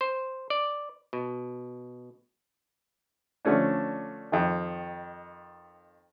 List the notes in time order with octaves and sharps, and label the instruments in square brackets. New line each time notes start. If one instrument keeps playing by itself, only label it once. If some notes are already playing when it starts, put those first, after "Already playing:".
[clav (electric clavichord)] C5
D5
B2
[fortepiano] D3 F3 A3 C#4 D4
F2 D#3